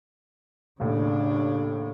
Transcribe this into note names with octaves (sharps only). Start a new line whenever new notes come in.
D#2 A2 C#3 D4